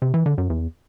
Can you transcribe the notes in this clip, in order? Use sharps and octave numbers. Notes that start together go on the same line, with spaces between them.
C3
E3
D3
F#2
E2